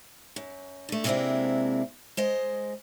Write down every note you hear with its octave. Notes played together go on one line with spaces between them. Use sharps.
F#2
D3 A3
C3 G#3 A#3 C4 D4 E4
G#3 C5 D#5